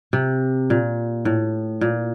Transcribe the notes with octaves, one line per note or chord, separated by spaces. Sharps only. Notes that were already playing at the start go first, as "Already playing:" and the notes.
C3
A#2
A2
A#2